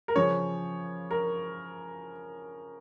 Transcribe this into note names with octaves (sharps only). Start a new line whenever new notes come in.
A#4
C#3 F3 C#5
A#4